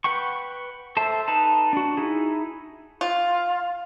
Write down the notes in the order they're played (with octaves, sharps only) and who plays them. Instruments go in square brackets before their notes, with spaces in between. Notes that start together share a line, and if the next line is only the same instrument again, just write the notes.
[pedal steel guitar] B4 F#5 G5 C#6
A4 C5 E5 A5
D#4 B4 A5
D4 F#4
D#4 E4 G#4
[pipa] F4